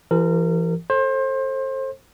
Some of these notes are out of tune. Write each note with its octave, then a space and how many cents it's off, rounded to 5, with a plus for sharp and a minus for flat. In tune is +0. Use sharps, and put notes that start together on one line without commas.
E3 +35 G4 +10 A#4 -30
A4 +0 C5 +30